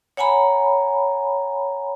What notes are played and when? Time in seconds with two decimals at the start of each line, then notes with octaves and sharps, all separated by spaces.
0.17 C#5 F#5 G#5 A#5 B5